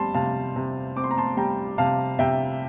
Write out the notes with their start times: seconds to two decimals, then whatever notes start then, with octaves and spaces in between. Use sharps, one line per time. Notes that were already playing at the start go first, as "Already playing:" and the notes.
Already playing: G3 C4 A5 C6
0.14 C3 F5 A5
0.56 C3
0.97 C4 D6
1.04 C6
1.11 A#5
1.18 A5 C6
1.37 G3 G5 A#5
1.78 C3 F5 A5
2.19 C3 E5 G5